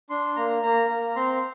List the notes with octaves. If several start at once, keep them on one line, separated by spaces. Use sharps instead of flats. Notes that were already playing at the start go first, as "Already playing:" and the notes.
D4 C6
A#3 A#5
A#3
A#3
C4 C6